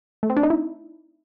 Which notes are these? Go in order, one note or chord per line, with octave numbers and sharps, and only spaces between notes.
A3
C4
D4
D#4
E4